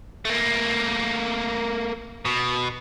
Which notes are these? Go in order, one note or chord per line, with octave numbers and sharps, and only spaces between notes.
A3 A#3
B2